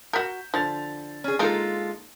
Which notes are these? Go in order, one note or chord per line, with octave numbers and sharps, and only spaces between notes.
F#4 A#4 G6 B6 E7
D3 F3 A6 F7
C#4 G#4
G#3 A#3 D#4 F4 A4 A#4